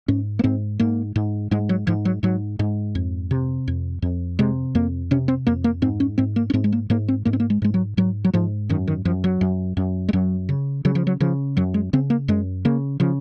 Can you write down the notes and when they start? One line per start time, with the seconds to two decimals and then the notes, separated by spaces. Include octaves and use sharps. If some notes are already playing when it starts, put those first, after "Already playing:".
0.08 G#2 C#4
0.39 A#3
0.44 G#2 C4
0.80 G#2 A#3
1.16 G#2
1.51 G#2 G#3
1.69 F#3
1.87 G#2 F3
2.05 F#3
2.23 G#2 F#3
2.59 G#2
2.95 F2
3.31 C3
3.68 F2
4.02 F2
4.39 C3 G#3
4.75 F2 A#3
5.11 C3 C#4
5.28 C4
5.47 F2 A#3
5.64 A#3
5.82 G#2 C4
6.00 C#4
6.18 G#2 C4
6.36 A#3
6.50 C#4
6.53 G#2 C4
6.64 G#3
6.72 A#3
6.90 G#2 A#3
7.08 C4
7.25 G#2 A#3
7.33 C4
7.40 A#3
7.50 G#3
7.62 G#2 G#3
7.74 F#3
7.97 G#2 F#3
8.24 F#3
8.33 G#2 F3
8.69 F#2 D#3
8.88 D#3
9.05 F#2 F3
9.24 F#3
9.41 F#2
9.77 F#2
10.09 G#3
10.13 F#2 F#3
10.49 C#3
10.85 C#3 F#3
10.95 F3
11.07 F#3
11.20 C#3 F3
11.57 F#2 F#3
11.74 G#3
11.93 C#3 C4
12.10 A#3
12.28 F#2 G#3
12.65 C#3 A#3
13.00 C#3 F3